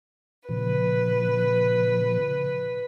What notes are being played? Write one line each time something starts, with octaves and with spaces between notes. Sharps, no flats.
A#2 C#3 F3 B4